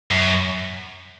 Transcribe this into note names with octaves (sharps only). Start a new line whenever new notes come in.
F#2